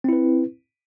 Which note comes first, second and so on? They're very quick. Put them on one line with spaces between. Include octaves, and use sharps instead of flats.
C4 E4 B4